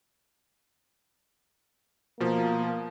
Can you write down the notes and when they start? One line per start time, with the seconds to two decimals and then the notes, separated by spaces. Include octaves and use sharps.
2.20 B2 F3 A#3